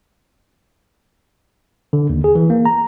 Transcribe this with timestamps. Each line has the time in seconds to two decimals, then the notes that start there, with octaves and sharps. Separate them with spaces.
1.93 D3
2.09 D#2
2.24 G#4
2.35 E3
2.50 A#3
2.65 A#5